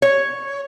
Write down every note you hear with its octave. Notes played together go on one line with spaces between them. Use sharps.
C#5